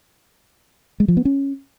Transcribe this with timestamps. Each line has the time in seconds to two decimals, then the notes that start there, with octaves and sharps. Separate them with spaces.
1.00 G#3
1.08 F3
1.17 B3
1.25 C#4